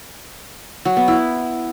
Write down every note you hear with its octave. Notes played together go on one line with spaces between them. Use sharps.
F#3
B3
E4